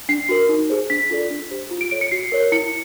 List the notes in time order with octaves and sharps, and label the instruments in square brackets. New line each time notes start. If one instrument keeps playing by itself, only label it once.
[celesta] D4 C7
F#4 A#4
D#4
G#4 C5
D4 B6
F4 A4 D5
D4
G4 C5
F4
D7
A4 C#5 D7
C#7
F#4 C7
A#4 C#5
E4 C#7